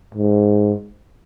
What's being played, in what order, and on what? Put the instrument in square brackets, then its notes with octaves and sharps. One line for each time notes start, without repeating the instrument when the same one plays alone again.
[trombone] G#2